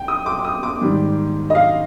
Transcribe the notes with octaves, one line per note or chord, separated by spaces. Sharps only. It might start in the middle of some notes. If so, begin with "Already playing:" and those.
Already playing: G5
D#6
D6
D6
D#6
D6
G#2 D#3 G3
D#5
F5